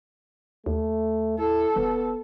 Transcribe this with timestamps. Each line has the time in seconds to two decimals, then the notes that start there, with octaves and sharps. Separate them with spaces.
0.66 D#2 A3
1.38 E4 A4
1.76 E1 B3